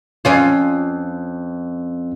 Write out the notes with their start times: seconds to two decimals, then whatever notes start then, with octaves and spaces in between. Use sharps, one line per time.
0.25 F2 C#4 F4